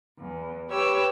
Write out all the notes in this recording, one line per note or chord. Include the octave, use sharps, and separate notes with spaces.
E2
G4 B4 C#5 G5 E6